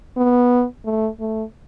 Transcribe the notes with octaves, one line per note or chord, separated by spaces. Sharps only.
B3
A3
A3